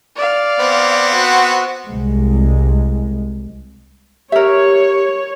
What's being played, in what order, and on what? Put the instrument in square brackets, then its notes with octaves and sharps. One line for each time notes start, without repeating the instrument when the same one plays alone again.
[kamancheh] D5 F5
[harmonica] B3 C4
[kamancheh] F#4
[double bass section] C2 G#3
[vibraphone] G4 [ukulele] A#4 E5 [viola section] C#5